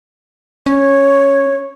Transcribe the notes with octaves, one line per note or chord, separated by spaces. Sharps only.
C#4 C#5